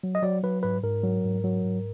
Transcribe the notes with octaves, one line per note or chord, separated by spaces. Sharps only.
F#3
D#5
F#3 D5
F#3 B4
G#2 B4
G#2 A#4
F#3
G#2
F#3
G#2